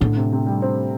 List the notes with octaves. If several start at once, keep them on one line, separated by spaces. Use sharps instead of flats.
A2 D3
C3
C3
G3
C4